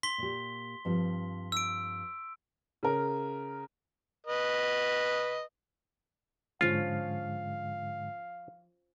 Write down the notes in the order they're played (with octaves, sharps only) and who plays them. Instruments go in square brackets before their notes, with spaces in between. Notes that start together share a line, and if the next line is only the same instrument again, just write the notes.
[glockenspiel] C6 B6 G7
[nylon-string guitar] A#2 G4
G2 F3 C4
[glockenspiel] E6 D7
[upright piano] C#3 A#4
[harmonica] B4 D#5
[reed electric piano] G#2 D3 G#3 [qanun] F3 C#4 [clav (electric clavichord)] F4 [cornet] F5